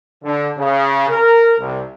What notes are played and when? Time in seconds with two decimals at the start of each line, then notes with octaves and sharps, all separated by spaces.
0.23 D3
0.57 C#3
1.09 A#4
1.58 C2